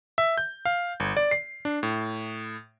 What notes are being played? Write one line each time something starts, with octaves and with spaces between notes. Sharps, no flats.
E5
G6
F5
G1
D5
C7
D4
A2